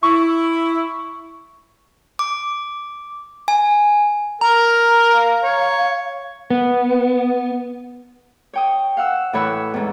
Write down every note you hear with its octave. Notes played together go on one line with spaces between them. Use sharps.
E4 C#6
D6
G#5
A#4 A#5
F5
C#5
B3
C#5 G5 D#6
F5 F#5 E6
A2 E3 C#5 B5 E6 F#6
E2 G#2